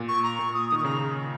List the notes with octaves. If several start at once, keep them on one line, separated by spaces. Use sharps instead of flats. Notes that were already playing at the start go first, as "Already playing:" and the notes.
Already playing: A#2
C#6
A#5
A#2 C#6
D#6
D#3 D#6
C#6
C#3 A#5